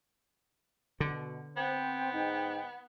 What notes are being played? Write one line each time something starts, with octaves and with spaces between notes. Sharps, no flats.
B2 D3
B3 C4 G5
G#2 D#4